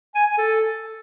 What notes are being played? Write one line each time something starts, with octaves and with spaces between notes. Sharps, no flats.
G#5
G#5
A4